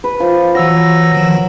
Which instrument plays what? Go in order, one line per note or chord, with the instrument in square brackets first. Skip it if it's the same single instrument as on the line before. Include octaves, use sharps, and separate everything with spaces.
[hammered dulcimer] B4
F3
[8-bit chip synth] E3 E6 A#6 [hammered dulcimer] F#3
[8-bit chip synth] D#3 F3